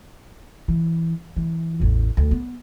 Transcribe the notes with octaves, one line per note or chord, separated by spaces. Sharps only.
E3
E3
A1 E2
D2
B3